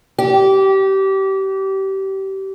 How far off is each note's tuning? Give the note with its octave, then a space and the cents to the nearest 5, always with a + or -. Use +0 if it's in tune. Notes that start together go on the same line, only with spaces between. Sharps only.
G4 -25